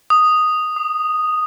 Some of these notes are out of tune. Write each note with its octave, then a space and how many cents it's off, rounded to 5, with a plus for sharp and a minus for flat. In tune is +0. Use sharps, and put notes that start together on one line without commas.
D#6 -5
D#6 -35